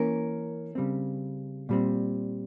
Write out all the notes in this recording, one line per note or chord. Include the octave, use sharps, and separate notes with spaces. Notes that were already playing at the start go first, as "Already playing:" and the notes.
Already playing: E3 A#3 C#4 A#4
C#3 G3 C4
A#2 G3 C4